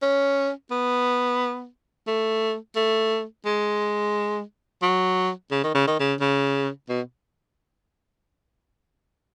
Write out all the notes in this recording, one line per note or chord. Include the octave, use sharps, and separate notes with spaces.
C#4
B3
A3
A3
G#3
F#3
C#3
D#3
C#3
D#3
C#3
C#3
B2